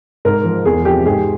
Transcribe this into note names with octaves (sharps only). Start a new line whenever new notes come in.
G#2 A#4
F3
E2 G#4
C3 F3 G4
G#2 G#4